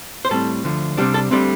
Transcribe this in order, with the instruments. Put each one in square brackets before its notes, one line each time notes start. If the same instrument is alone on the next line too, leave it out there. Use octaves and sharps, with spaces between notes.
[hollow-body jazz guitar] C5
A2 G3 C4 A4
D2 D3 F3
C2 C3 G3 D4 G4
A4
D2 D3 G3 C4 D5